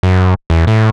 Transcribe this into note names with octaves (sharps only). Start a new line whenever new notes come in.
F#2
E2
A2